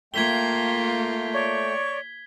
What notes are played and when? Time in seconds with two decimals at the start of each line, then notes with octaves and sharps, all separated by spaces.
0.14 A3 A#3 F4 G5 G#6 B6 G7
1.33 C#5 D5 C#6